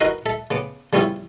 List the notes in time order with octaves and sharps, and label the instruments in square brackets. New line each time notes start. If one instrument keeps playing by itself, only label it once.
[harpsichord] D#4 F#4 A#4 B4 D#5
A4 E5
C#3 B3 D6
C#3 G3 B3 C#4 E4 F4